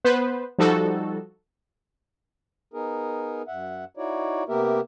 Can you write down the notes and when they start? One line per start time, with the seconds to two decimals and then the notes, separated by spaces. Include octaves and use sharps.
0.04 B3 B4 C5
0.59 F3 G3 D#4 F#4 A4
2.74 B3 D#4 G#4 A#4
3.47 F#2 E5 F#5
3.97 D#4 E4 F#4 C#5 D5
4.48 C3 A#3 B3 G4 A#4 E5